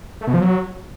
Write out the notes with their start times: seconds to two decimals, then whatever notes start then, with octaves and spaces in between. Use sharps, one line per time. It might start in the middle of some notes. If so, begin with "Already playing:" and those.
0.21 A3
0.27 B2
0.34 F3
0.40 F#3